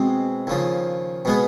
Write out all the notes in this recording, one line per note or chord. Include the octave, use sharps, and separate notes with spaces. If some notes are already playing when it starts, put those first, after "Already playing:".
Already playing: B2 G#3 C4
D#2 C#3 F3
B2 G#3 B3